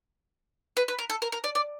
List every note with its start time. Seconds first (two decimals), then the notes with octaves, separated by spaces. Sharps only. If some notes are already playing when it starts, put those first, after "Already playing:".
0.77 B4
0.88 B4
0.99 A#4
1.10 A4
1.22 A#4
1.32 A#4
1.44 D5
1.55 D5